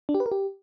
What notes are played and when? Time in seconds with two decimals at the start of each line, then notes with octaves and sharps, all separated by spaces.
0.09 D4
0.15 G4
0.20 B4
0.26 A#4
0.32 G4